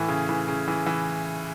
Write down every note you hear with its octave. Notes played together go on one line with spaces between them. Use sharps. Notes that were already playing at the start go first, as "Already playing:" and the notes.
Already playing: A2 E3
C#3
E3
C#3
E3
E3